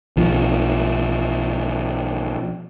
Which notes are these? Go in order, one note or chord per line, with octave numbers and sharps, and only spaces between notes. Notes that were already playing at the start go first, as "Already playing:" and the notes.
B1 F3